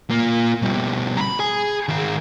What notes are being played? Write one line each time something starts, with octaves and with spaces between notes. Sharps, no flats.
A#3 F4
B2 G3
A#5 B5
G#4 G#5
D#3 G#4